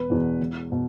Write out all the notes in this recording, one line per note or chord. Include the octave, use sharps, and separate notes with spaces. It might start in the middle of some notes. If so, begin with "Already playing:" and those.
Already playing: E1 B4
E2 B2
E1
B2